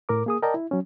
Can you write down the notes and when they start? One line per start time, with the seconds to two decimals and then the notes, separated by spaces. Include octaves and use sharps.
0.09 A2 A#4 D6
0.26 A#3 G#4 D#6
0.43 A#4 D5 D#5 G5 A5 A#5
0.54 E4
0.71 F#3 C#4